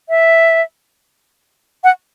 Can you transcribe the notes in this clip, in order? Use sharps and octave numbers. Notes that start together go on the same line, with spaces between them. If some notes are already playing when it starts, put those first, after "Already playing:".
E5
F#5